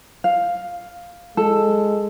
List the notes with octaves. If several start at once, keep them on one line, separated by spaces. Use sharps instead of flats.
F5
G#3 A4